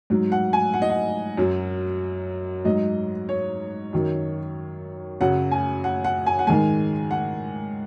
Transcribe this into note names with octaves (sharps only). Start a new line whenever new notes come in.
G#2 F#3
F#5
G#5
F#5
D#5
F#5
F#2 F#3
G#2 F#3 D#5
C#5
F#2 D#3 F#3
F#2 C#3 F#3 F#5
G#5
F#5
F#5
G#5
F#5
G#2 D#3 G#3 G#5
F#5